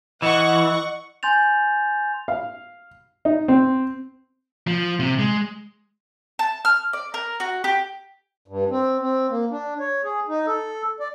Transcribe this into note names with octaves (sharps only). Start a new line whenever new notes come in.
E3 D#5 F#5 C#6
G#5 C6 G6 A6 F7
F5
D#4
C4
F3
C3
G#3
A5
F6
D5
A#4
F#4
G4
G2
C4
C4
A#3
D4
C#5
G#4
D#4
A4
D5